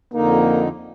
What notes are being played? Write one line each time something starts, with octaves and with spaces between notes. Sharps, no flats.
F2 D3 A#3 D#4